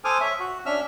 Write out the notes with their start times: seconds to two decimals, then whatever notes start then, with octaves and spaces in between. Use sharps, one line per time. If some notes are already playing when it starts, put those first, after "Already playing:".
0.04 A4 C5 G#5 D6 D#6 F6
0.21 C#5 E5
0.40 F#4
0.66 C#4 D4 E5 E6 F6